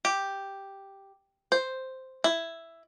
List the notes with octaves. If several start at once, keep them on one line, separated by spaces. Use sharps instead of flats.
G4
C5
E4